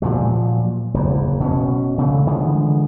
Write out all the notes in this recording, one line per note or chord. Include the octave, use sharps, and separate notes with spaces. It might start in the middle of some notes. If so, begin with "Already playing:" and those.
A#2 F3 F#3
F#1 E2
B2 C4 C#4
C#3 A3
D3 E3 F3 G#3